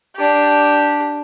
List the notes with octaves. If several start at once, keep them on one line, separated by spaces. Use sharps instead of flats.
D4 G4